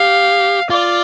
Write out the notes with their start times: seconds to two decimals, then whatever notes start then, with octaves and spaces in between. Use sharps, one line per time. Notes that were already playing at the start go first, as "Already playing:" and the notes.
Already playing: G4 F5
0.70 F4 D5